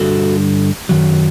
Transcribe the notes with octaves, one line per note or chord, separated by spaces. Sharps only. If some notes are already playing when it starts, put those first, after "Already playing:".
Already playing: G2 D3 G3 F#4 A4
F#2 D#3 F#3